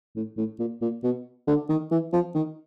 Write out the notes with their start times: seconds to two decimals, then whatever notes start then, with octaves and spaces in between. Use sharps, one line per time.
0.16 A2
0.37 A2
0.59 A#2
0.82 A#2
1.04 B2
1.47 D3
1.69 D#3
1.91 E3
2.13 F3
2.35 D#3